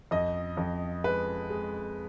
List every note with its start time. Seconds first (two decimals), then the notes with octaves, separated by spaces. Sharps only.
0.11 F2 D#5
0.57 F2
1.04 G#3 B4
1.50 G#3